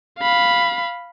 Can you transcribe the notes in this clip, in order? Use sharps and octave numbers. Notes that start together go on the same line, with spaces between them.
F5 B5